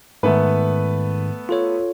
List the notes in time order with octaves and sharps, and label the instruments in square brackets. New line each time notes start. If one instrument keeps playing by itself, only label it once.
[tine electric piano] G#2 D#3 [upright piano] A3 B3 B4
[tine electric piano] F4 A4 C#5